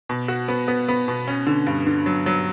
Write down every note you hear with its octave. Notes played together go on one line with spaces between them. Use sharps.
B2
F#4
B3
B3
B3
B2
C#4
D3
G2
D3
F#3
F#3